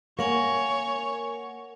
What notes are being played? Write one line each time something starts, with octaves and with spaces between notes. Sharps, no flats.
A#3 A#4 C#5 F#5 G#5